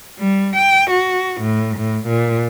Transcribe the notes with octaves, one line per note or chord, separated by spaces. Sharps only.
G3
G5
F#4
A2
A2
A#2